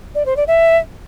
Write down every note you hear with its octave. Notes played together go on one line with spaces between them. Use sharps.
D5
C5
D5
E5